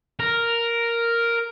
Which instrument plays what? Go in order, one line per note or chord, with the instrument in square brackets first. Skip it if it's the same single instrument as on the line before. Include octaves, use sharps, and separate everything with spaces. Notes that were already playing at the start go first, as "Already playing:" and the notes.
[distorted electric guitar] A#4